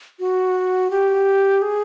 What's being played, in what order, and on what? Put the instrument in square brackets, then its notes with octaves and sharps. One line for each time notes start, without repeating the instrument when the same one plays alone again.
[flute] F#4
G4
G#4